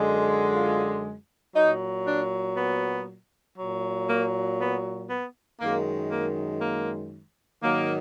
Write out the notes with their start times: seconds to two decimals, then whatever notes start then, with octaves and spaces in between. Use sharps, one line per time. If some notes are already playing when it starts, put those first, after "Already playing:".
Already playing: F#2 D3 G#3
0.55 F4
1.56 A#2 F#3 D#4
2.06 D4
2.57 B3
3.58 A#2 F#3
4.09 A#3
4.59 B3
5.10 B3
5.60 F#2 D#3 G#3 A#3
6.11 A#3
6.62 A#3
7.63 G#2 D#3 F#3 A#3